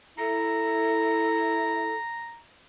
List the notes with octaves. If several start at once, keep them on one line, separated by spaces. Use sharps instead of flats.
E4 A4 A#5